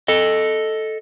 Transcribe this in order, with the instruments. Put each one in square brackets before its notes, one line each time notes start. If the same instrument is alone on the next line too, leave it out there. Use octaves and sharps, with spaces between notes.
[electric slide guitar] A4 D#5